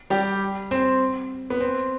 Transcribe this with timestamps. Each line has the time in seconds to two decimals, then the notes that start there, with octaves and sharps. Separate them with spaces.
0.10 G3 G4
0.71 C4
1.50 B3
1.60 C4